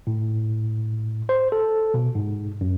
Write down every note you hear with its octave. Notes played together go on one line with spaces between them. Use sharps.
A2
C5
A4
B2
G#2
F#2